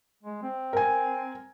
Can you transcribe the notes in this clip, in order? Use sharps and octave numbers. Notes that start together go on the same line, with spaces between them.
G#3
C4
A#4 G#5